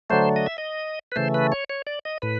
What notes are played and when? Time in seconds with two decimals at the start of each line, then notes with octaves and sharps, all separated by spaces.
0.10 D3 F#3 A3 C5
0.36 D#5
0.46 E5
0.58 D#5
1.12 B4
1.16 C#3 E3 A3 C5
1.34 B4
1.52 C#5
1.70 C#5
1.87 D5
2.05 D#5
2.22 A2 B4